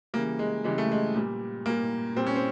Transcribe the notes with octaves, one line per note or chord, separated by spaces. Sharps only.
C#3 E3 G3 A#3
G#3
C#3 E3 G3 G#3
A3
G#3
A#2 G3
A#2 G3 A#3
A#2 G3 C4
C#4
C4